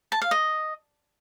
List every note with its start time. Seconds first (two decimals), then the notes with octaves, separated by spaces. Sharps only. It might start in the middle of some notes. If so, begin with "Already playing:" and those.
0.12 A5
0.22 F5
0.31 D#5